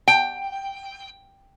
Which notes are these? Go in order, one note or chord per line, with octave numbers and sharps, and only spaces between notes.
G5